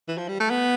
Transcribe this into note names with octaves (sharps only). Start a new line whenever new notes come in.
E3
F3
G3
A3
B3